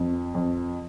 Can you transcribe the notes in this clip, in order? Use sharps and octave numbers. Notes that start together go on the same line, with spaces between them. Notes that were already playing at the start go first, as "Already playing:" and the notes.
Already playing: F2
F2